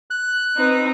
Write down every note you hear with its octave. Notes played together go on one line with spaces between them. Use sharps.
F#6
C4 D#4 B4